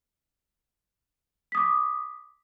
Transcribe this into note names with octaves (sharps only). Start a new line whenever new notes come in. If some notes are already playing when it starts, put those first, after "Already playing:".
D6 D#6 B6